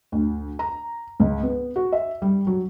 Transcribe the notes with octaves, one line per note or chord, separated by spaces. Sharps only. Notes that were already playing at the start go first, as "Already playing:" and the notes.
D2
A#5
C#2
B3
F#4
E5
G3
F#3